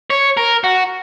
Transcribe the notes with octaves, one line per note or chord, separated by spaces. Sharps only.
C#5
A#4
F#4